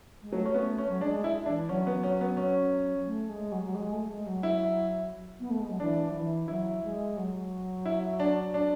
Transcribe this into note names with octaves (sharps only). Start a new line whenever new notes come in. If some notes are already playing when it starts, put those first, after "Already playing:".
G#3
F#3 A3
C#4
B3
C#4
F#3
G#3 D4
E4
E3 D4
F#3 C#4
B3
C#4
B3
C#4
A3
G#3
F#3
F#3
G#3
A3
G#3
F#3
E4
B3
A3
G#3
F#3
E3 D4
F#3
E3
F#3 E4
G#3
F#3
E4
D4
D4